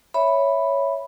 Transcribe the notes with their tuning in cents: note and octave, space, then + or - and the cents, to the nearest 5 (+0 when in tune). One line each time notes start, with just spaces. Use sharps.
C#5 +0 E5 +0 B5 +0